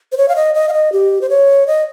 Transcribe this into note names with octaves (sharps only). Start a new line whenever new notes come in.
C5
C#5
F5
D#5
D#5
F5
D#5
G4
C5
C#5
D#5